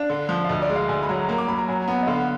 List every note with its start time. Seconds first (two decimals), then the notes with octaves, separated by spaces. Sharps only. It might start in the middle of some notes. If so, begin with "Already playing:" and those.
Already playing: D4 F5
0.10 D3
0.29 F3
0.44 F5
0.49 D2 D#5
0.62 D5
0.69 G#3
0.76 F5
0.88 D2 G#5
1.03 B5
1.09 F#3 A#5
1.28 A#3 A#5
1.38 D6
1.48 F#3 B5
1.58 A#5
1.68 F#3 G#5
1.88 B3
2.02 D#5
2.07 D3 F5